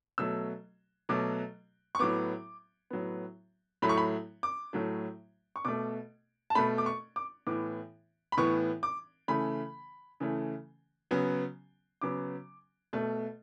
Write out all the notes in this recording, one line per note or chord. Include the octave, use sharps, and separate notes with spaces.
B2 F#3 A3 E6
B2 F#3 A3 D6
C#6
A2 F#3 B3 D6
A2 F#3 B3
A2 F#3 A3 B5
C#6
B5
D6
A2 F#3 A3
C#6
B2 A3 D6
A5
B2 A3 B5
D6
C#6
D6
A2 E3 B3 D6
B5
A2 E3 B3 C#6
D6
C#3 E3 A3 B5
C#3 E3 A3
C#3 F#3 B3
C#3 F#3 B3 D6
B2 A3